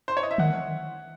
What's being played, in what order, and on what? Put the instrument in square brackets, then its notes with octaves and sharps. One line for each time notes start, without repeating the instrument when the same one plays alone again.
[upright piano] C5
C#5
D#5
E5
[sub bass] D#3 [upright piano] F#5